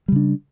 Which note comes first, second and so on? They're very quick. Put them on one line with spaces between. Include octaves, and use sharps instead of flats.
G3 C#3 D4